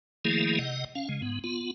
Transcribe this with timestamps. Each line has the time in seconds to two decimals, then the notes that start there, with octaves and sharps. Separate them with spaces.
0.25 D#3 F3 A3 A#3 E4 G#4
0.59 C3 D#5 F#5
0.95 C#4 F5
1.09 C#3 G#3
1.22 G#2 B3
1.44 B3 F4